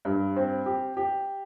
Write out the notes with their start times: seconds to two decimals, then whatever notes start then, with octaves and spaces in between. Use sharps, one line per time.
0.05 G2
0.36 C4
0.66 G4
0.97 G4